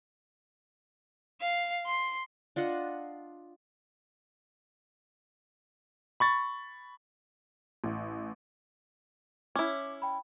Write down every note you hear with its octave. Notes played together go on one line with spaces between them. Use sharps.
F5
C6
D4 F4 D#5 F#5
B5 C#6 A6
A1
C#4 E4 D6
G5 B5